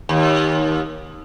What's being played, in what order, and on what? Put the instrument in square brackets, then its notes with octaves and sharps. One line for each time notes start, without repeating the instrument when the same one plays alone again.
[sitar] D#2